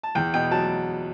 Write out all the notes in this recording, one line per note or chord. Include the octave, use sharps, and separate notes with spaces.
A5
E2 G5
B2 G5
F#3 A5